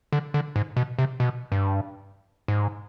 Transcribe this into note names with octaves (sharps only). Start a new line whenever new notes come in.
D3
D3
G#2
B2
C3
B2
G2
G#2